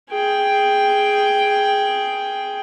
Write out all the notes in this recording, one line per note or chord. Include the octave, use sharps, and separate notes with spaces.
G#4 G5